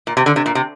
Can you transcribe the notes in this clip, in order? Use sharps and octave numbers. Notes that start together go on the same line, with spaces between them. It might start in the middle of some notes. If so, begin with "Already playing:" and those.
A#2
C3
D3
C3
A#2
C3